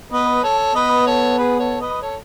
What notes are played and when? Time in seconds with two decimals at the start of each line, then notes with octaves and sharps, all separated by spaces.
0.12 B3 B4 D#5
0.44 A4 C#5
0.75 B3 B4 D#5
1.07 A4 C#5
1.38 G#4 B4
1.59 A4 C#5
1.81 B4 D#5
2.02 A4 C#5